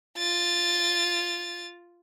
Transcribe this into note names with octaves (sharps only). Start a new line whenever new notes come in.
F4 A6